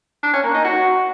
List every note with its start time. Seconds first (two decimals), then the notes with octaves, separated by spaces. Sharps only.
0.23 D4
0.33 C#4
0.44 A#3
0.54 D#4
0.64 F#4